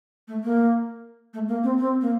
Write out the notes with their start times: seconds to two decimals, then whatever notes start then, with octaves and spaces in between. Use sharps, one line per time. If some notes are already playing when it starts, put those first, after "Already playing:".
0.28 A3
0.44 A#3
1.34 A3
1.48 A#3
1.63 C4
1.79 C4
2.01 A#3